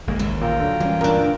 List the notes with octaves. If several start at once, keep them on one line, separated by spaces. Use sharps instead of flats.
G1 G#3 A#3
A1 D#2 C#3 E4
A#2 F4 G5 A#5
D3 F#3
E3 G3 A#3 C#4
D2 G2 A#2 D4 A#4